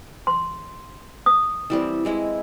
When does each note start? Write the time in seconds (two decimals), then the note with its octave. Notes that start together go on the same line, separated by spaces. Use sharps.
0.27 C6
1.26 D#6
1.70 E3 G3 C4
2.05 E3 G#3 E4